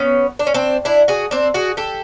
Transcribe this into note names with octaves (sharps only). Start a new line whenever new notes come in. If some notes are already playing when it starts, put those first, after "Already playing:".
Already playing: B3 C#4
D4
C#4
C4 D4
D4 E4
F#4 G#4
C4 D4
F#4 G#4
G4 A4